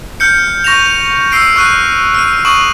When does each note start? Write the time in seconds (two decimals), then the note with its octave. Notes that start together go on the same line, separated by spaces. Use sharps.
0.20 F6 G6 C#7
0.64 C#6 A#6 E7 F7
1.32 E6 F6 C7 D7 D#7
1.56 C#6 F6 F#6 D#7
2.14 F6 D#7
2.45 C#6 D#6 D7 E7 F#7